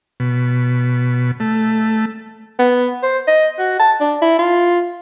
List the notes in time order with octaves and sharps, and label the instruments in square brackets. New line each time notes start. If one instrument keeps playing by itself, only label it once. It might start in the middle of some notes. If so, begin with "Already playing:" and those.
[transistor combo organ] B2
A3
[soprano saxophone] B3
C5
D#5
F#4
A5
D4
E4
F4